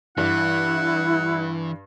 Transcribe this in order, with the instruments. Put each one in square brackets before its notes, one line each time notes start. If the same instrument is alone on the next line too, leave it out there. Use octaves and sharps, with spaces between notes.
[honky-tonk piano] G2 [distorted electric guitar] E3 [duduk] E4 [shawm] F#5